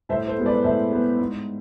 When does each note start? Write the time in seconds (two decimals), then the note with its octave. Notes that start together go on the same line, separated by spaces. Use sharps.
0.09 A2 C5 E5
0.27 A4 C5
0.37 G#3 B3
0.46 B4 D5
0.64 A2 C5 E5
0.92 G#3 B3
1.19 G#2